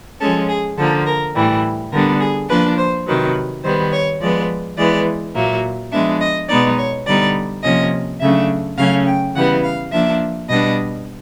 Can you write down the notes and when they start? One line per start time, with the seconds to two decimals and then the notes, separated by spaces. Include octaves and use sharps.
0.21 F3 G#3 C#4 A4
0.49 G#4
0.77 D3 F3 A#3 A4
1.07 A#4
1.35 A2 E3 G3
1.92 D3 G3 B3 D4 A#4
2.20 G#4
2.49 F3 A#3 D4 B4
2.78 C5
3.07 C3 D#3 F#3 B4
3.64 D#3 G3 B3 C5
3.93 C#5
4.20 F3 G#3 B3 D5
4.78 E3 G#3 B3 D5
5.35 A#2 F#3 A#3 E5
5.92 F3 G#3 B3 D4 E5
6.21 D#5
6.49 B2 G#3 B3 D#4 D5
6.78 C#5
7.06 D3 G3 B3 D#4 D5
7.63 C3 F3 A#3 C#4 D#5
8.20 C#3 F#3 A3 D4 E5
8.78 C#3 F#3 A3 C#4 F5
9.06 G5
9.35 C#3 E3 G3 B3 F#5
9.64 F5
9.91 F3 A#3 D4 E5
10.49 B2 G3 B3 D4 D#5